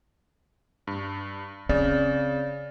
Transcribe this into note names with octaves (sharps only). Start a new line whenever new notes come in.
G2
C#3 C4 D5 A6